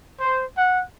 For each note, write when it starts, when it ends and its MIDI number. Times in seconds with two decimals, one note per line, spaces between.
0.21 0.42 72
0.57 0.81 78